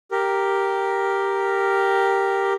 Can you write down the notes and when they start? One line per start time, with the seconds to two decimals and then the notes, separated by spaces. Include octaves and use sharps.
0.11 G4 A#4